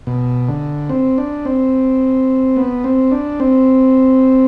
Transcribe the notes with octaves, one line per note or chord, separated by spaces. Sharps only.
B2
D3
C4
D4
C4
B3
C4
D4
C4